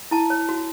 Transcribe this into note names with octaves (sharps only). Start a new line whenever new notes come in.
E4 A5
C#5
F#4